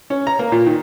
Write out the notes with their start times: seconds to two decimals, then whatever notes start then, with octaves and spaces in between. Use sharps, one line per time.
0.10 C#4
0.27 A#5
0.39 A#3
0.52 A#2
0.66 D#3